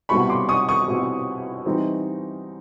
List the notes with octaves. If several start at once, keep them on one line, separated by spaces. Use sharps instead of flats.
C2 B2 G3 C4 E4 B5 C#6
C6 D6
C#6 D#6
C#6 D#6
C2 B2 G3 C4 E4
E3 G3 C4 D#4